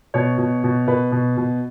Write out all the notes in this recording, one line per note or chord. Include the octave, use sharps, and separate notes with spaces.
B2 C#5
B2
B2
B2 B4
B2
B2